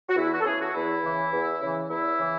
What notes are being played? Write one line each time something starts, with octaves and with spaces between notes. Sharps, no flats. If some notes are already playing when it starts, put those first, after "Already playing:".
F#4
E2 E4
F#4
A4
C#3 E3 G#4
F#4
E2 E4
C#3 E3
E2
C#3 E3
E2 E4
C#3 E3